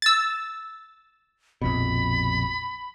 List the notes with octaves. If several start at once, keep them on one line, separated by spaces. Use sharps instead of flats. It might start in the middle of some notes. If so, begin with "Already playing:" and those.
E6 A6
A#1 F2 B2 B5